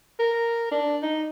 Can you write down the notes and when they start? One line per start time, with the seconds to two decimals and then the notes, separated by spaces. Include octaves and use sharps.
0.19 A#4
0.71 D4
1.02 D#4